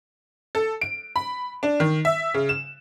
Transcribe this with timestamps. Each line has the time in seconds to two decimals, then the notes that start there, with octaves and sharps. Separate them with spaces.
0.55 A4
0.81 D7
1.16 B5
1.63 D4
1.80 D#3
2.05 E5
2.34 C#3
2.49 E7